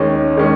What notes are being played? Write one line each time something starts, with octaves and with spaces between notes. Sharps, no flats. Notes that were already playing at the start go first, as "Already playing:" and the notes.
Already playing: D#2 D#3 G#3 C#4
D#3 G#3 C#4